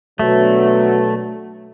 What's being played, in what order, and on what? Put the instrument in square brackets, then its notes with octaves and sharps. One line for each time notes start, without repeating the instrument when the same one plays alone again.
[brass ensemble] B2 D3 F#3 [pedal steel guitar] A3